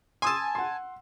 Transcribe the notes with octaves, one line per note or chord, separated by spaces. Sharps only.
G#5 A5 C6 D#6 E6
F#5 C6